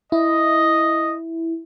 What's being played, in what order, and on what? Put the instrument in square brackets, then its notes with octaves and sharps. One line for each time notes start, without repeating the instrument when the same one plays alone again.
[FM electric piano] E4 [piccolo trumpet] D#5